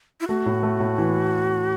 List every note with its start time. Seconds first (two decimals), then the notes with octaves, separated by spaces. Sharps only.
0.21 E4
0.28 A3 F#4
0.46 A2
0.63 A3
0.80 A2
0.98 E3